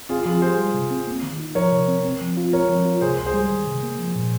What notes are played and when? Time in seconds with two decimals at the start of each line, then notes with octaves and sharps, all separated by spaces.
0.09 C4 F4 G#4
0.26 F3 F4 G#4
0.42 G4 G#4 C5
0.58 G3
0.74 C3
0.91 C4
1.07 A#3
1.23 D#3
1.40 D#4
1.55 F3 A#4 C#5
1.72 C3
1.88 C4
2.05 C4
2.21 F3
2.37 F4
2.53 C4 A#4 C#5
2.69 F3
2.85 F4
3.01 C3 G#4 C5
3.18 C#2
3.26 G#4 C5
3.34 G3
3.50 D#3
3.66 C3
3.83 A#3
3.99 F3
4.15 A#2